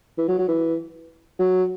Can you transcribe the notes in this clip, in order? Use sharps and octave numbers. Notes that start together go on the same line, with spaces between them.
E3
F#3
F#3
E3
F#3